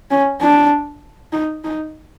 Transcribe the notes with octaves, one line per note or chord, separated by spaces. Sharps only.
C#4
D4
D#4
D#4